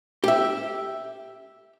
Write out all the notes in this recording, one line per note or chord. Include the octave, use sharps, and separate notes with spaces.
G4 E5